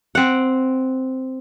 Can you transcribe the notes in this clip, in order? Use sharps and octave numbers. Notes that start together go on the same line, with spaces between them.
C4 F#5